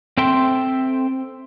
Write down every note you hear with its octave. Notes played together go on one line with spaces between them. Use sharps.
C4 A4 E5 G5 C6